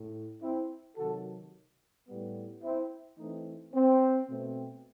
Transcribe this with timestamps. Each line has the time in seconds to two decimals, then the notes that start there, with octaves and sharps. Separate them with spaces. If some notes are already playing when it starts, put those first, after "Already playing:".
Already playing: A2
0.42 C4 E4
0.97 C3 D#3 F#3 F#4 A4
2.07 A2 G3 B3
2.63 C4 E4
3.18 E3 A3 C4 D#4
3.74 C4
4.29 B2 A3 C4